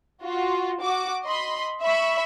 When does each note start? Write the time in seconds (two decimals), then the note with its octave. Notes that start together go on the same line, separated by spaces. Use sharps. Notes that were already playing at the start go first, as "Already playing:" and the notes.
0.23 F4 F#4
0.81 F#4 D6
1.25 D#5 B5 C6
1.81 E5 B5 C#6